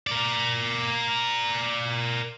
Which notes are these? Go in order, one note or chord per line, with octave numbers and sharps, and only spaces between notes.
A#4 D5